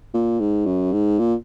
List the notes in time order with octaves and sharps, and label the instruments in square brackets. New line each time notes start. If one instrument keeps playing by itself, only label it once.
[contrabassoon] A#2
G#2
F#2
G#2
A#2